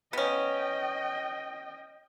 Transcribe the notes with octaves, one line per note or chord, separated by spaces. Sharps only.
B3 C#4 D#5 G5